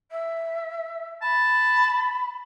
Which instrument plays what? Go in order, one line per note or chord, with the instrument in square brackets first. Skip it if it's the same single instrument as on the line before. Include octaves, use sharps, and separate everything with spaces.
[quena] E5
[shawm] A5 [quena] B5